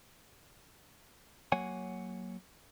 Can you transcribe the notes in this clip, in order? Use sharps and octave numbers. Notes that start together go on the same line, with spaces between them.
F#3 A#3 C#5 F#5 G#5